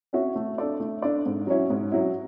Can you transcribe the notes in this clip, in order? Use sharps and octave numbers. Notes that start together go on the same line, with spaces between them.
C#4 F#4 C#5 E5
A3
D4 A4 D5
A3
D4 A4 D5
G#2
F#3 C#4 E4
G#2
F#3 C#4 E4